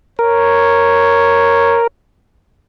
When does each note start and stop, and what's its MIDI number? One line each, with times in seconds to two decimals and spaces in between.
0.19 1.87 70
0.19 1.83 73